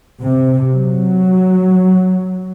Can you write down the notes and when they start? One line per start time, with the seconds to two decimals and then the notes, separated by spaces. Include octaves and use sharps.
0.22 C3
0.72 F#3